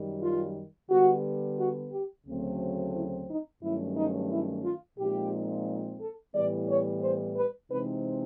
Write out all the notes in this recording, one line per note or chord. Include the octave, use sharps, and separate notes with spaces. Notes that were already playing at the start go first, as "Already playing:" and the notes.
Already playing: F#2 D#3 G3
F4
D3 G3 B3 F#4
F#4
G4
D2 C#3 F#3 A3 C4
E4
D#4
G2 D#3 F#3 A3 C#4 E4
D#4
E4
F4
A#2 F3 G#3 C4 D#4 G4
A4
A2 E3 G3 B3 D5
C#5
C5
B4
C3 E3 G#3 C4 D#4 B4